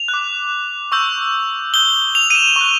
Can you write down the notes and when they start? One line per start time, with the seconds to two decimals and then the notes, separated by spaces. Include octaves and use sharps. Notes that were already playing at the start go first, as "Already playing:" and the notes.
Already playing: F7
0.08 F#6
0.14 D6
0.92 C#6 E6 G6
1.73 D#6 G6 G7
2.15 F7
2.30 D#7
2.35 E7
2.56 C#6 F#6